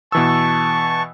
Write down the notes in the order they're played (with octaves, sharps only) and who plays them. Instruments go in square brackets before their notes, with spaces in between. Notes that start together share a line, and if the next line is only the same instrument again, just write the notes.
[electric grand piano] B2 E3 E6 [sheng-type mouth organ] A5 C#6